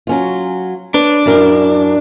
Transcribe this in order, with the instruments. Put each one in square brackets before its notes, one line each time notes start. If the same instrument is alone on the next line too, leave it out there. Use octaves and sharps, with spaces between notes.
[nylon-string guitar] F#3 C#4 F4
[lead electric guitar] D4 [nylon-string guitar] B4 C#5
[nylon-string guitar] F#2 E4 A#4